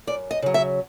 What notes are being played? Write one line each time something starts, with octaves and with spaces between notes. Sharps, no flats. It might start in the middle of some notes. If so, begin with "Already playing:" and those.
F#2 D5
D#5
C#3 F#3
E5